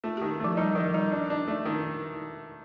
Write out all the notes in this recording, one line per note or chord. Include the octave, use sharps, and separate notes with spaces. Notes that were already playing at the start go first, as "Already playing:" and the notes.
A3 F4
D#3 G4
F3 A3
G3 D#4
D#3 F3
G3 D#4
D4
D4
A3
D#3